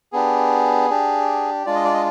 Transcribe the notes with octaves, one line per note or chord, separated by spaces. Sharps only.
B3 D4 G4 G#4
D4 G4
G#3 D4 F4 D5
D#5
D5
D#5